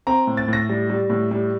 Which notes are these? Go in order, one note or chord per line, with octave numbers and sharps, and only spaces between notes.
C4 A#5
A2
A6
A2 A#6
G3
G3
A2
G3